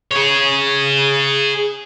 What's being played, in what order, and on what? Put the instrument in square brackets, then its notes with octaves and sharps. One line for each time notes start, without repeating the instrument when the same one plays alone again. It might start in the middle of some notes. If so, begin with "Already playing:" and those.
[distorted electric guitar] G#4 C#5